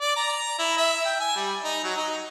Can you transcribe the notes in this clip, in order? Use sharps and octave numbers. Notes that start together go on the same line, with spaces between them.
D5
A#5
E4
E5
G5
G#5
G3
D#4
F#3
D#4